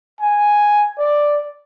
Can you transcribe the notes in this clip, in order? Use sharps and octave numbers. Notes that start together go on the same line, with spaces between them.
G#5
D5